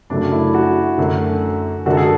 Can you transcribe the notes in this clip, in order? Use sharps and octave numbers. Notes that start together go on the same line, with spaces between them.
F#2 C#3 F#3 A3 D4
E4
F#4
F#2 D3 A3
F#2 D3 G#3 D4 F#4
A4
G#4